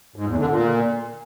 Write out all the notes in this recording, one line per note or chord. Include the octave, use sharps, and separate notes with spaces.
G#2
E2
D3
A#2